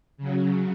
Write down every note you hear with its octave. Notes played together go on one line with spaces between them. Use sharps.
C#3 F#3